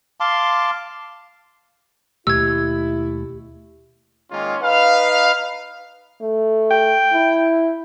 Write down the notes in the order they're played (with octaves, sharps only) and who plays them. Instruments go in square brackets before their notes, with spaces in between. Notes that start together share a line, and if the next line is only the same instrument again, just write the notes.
[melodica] F5 A5 C6 D6
[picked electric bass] D#2 B2 A3 [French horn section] E4 [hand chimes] G4 [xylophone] E6 G#6
[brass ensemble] D#3 G#3 A#3 C#4 F4
D#4 B4 F5
[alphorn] A3
[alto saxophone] G5
[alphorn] E4